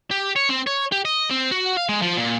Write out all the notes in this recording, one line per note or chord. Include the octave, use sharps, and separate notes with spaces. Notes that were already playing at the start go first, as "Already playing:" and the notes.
G4
C#5
C4
C#5
G4
D#5
C4
F#4
F5
G#3
F3
A#2